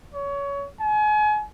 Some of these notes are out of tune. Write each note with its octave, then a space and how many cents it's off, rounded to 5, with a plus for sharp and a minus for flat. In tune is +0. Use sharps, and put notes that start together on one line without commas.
C#5 +25
G#5 +35